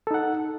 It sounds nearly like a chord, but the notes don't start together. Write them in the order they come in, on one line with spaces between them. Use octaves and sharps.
A4 D#4 F#5